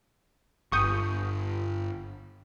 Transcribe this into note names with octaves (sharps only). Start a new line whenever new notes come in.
G1 C#6 D#6 G6